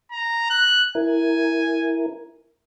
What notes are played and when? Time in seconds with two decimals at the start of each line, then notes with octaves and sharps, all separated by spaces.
0.11 A#5
0.50 F#6
0.95 E4 A#4 G#5